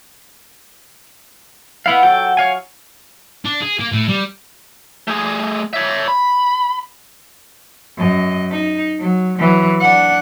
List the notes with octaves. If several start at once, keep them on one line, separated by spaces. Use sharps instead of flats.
B3 E4 F5 F#5
F#3 A4 G5
C#5 F5 G#5
D4
G#4
A#3
A2
G3
A3 G#4
C#5 E5
B5
F#2 D#5
D#4
F#3
E3 F#3
D4 F#5